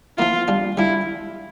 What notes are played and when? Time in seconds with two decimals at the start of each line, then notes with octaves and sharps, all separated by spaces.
0.18 F3 A#3 E4 F4
0.48 G3 D4 F4
0.77 G3 D4 E4 F4